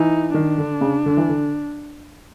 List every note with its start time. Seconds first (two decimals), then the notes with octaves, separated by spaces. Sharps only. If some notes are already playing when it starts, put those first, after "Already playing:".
Already playing: E3 D#4
0.34 D#3 D4
0.58 D3
0.81 C#3
1.06 D3
1.17 E3
1.29 D3